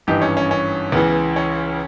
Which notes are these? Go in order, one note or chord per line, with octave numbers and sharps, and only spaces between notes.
G#1 G2 E3 D#4 G4
C#4
C#4
C#4
C#2 C#3 E3 B3
C#4